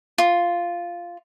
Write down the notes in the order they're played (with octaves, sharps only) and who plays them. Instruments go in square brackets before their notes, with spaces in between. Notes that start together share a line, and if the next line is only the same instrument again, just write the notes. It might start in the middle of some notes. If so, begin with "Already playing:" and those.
[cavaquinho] F4